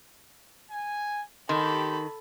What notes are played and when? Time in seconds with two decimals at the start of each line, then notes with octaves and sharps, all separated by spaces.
0.70 G#5
1.49 D#3 G4 A4 B5 C6